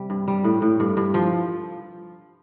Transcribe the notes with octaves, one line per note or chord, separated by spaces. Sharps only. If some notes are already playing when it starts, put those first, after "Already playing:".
Already playing: C3 G3
G2
G3
A2
A2
G2
G2
F3